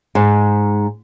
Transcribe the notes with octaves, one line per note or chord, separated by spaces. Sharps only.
G#2